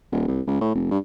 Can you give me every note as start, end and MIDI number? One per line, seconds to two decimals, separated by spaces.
0.12 0.25 27
0.28 0.41 36
0.47 0.58 37
0.61 0.74 45
0.75 0.90 29
0.91 0.98 43